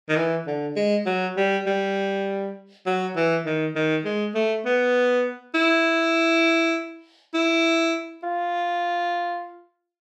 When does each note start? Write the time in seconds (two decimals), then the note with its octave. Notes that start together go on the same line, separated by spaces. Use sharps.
0.09 D#3
0.16 E3
0.47 D3
0.76 G#3
1.06 F#3
1.37 G3
1.67 G3
2.86 F#3
3.16 E3
3.46 D#3
3.75 D#3
4.05 G#3
4.35 A3
4.65 B3
5.54 E4
7.34 E4
8.23 F4